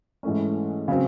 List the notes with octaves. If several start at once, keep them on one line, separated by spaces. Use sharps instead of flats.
G#2 E3 A3 C#4
C#3 F#3 C4